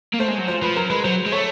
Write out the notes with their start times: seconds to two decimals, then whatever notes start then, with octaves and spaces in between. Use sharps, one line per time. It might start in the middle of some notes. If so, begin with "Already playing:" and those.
0.14 A#3
0.19 A3 C5
0.29 G#3
0.39 F#3
0.48 F3 C5
0.62 F3 B4
0.76 F#3 A#4
0.90 G#3 B4
1.04 F#3 C5
1.26 G#3
1.32 A3 C#5